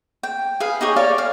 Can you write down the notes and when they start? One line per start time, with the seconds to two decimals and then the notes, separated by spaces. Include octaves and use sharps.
0.23 G5
0.60 G#4 B4 F5
0.81 D#4 G4 G#4 C#5
0.96 A4 C#5 D5 F5
1.18 F5